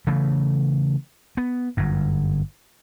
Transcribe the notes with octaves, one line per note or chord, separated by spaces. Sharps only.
C#3 E3 A3
B3
G1 F#2